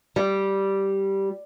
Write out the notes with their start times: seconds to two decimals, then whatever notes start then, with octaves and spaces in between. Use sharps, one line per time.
0.16 G3